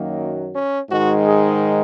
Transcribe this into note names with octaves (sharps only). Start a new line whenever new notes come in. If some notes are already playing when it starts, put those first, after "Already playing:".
Already playing: F#2 D#3 F#3 A#3
C#4
G#2 D#3 G#3 F#4
G#4